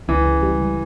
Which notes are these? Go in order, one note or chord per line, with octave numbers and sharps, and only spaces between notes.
C#2 E3
C#3
G3
C#2